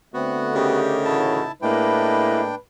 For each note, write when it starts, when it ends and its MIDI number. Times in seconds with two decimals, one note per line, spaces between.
0.14 1.42 50
0.14 1.42 57
0.14 0.80 59
0.14 0.51 60
0.14 0.80 66
0.54 1.48 49
0.54 1.48 63
0.54 1.05 67
0.54 1.48 70
1.05 1.43 45
1.05 1.43 52
1.05 1.52 64
1.05 1.43 66
1.05 1.52 81
1.62 2.53 45
1.62 2.53 56
1.62 2.53 58
1.62 2.55 62
1.62 2.42 64
1.62 2.57 71
1.62 2.55 79